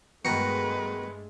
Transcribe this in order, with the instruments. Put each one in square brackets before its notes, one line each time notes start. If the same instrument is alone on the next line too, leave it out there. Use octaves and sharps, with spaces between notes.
[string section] G2 G#3 A3 [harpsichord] B2 D#3 A#4 [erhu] B4 [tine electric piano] C#7